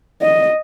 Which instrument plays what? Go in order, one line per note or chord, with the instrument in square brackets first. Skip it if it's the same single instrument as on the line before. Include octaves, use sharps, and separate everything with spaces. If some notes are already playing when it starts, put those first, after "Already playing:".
[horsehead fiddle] D#5